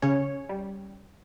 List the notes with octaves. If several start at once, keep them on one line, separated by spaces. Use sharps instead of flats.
C#3 C#4 C#5
G3